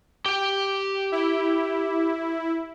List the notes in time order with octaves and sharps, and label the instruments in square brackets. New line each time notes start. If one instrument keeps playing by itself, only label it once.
[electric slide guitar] G4 G5
[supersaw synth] E4